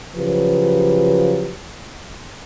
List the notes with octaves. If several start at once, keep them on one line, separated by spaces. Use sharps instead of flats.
C#3 F3 F#3 G4 B4